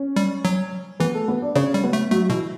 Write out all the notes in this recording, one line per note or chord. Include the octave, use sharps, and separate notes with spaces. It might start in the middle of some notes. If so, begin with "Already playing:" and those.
Already playing: C#4 C#5
G3
F#3
E3 B3 B4
A3 A4
B3 B4
D4 D5
C#3 C#4 C#5
G3
B3 B4
A3
F#3 A3 F#4
B2 E3 E4